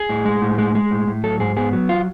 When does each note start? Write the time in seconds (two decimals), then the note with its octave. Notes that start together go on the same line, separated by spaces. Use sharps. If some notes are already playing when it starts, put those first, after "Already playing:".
Already playing: G#4
0.09 A2
0.25 G#3
0.42 A2
0.58 G#3
0.75 G#3
0.91 A2
1.07 A2
1.24 F#3 A4
1.40 G#2 G#4
1.56 B3 G#4
1.73 F#3
1.89 F4